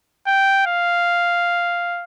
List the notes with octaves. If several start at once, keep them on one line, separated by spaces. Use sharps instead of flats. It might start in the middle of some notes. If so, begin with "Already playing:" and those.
G5
F5